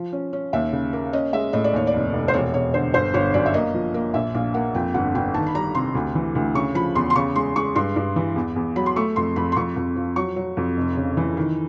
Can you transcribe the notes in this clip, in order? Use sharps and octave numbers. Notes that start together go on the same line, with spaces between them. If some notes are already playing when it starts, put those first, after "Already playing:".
Already playing: F3
C#4
C#4
D#2 E5
C#3
A#3
C#4 D#5
G#3 E5
A2 D#5
D5
D#2 C#5
D5
F1
F1
C5
E1 C#5
E1 C#5
D3 C5
G1 C5
G1 C#5
F#2 D5
E5
A#3 D#5
F3
A#3
A#1 E5
A#1 F5
A#3 F#5
F2 G5
G1 F#5
G1 G5
D#3 A5
B5
G3 A#5
C3 C6
D2
E3
D2
C#3 C#6
F3 B5
E2 C6
C6
C#3 C#6
G#3 C6
G#3 C#6
G2 C6
G2
E3
E2
E2
F#3 B5
C6
A3 C#6
F2 C6
F2 B5
C6
F2 C#6
F2
F3
F#3 C#6
F#3
F2
F1
C#3
E3
D#3